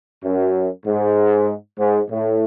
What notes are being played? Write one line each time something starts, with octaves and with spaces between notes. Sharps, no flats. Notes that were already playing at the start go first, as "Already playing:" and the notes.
F#2
G#2
G#2
A2